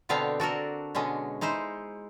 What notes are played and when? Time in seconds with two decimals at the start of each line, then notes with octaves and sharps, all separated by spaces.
0.09 B2 D3 B3 C4 D4 F5
0.40 D4 F#4 A4 A#4
0.95 B2 D3 G#3 C#4
1.41 G#3 D#4 E4 C5